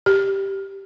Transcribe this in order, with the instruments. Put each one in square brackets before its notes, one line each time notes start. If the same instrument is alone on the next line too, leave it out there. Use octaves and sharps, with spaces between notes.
[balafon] G4